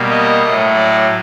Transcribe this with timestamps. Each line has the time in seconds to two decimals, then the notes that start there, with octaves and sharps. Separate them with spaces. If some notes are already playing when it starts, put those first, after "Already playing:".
Already playing: B2 G3 A#3
0.10 D#5
0.43 A2 F#3 A3
0.74 D5